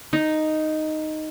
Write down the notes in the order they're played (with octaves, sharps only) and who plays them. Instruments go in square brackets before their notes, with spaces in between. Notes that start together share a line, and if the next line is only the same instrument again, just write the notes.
[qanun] D#4